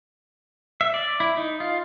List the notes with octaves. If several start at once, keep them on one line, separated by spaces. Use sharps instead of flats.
E5
D5
E4
D#4
F4